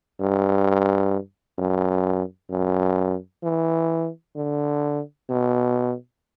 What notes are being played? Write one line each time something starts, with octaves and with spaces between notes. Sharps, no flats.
G2
F#2
F#2
E3
D3
B2